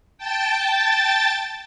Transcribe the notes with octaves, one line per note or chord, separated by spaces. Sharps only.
G5 A5 A6